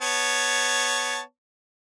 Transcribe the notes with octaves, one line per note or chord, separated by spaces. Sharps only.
B3 C#5 A5